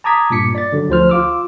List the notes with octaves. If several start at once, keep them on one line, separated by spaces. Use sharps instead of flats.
A5 A#5 D6 D#6 G#6 B6
G2 A#2 D6 B6 C#7
D5 A6
D3 F#3
D2 F3 C5 F6
F4 D6 E6